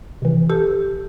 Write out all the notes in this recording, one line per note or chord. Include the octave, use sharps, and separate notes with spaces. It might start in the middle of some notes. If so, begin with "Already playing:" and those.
C3 E3
G4 A4